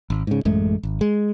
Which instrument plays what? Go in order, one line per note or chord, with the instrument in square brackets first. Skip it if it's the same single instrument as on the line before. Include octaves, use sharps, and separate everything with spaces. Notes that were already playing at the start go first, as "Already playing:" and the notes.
[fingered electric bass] G#1
G#2 C#3
A1 F#2 G#3 A3
G#1
G#3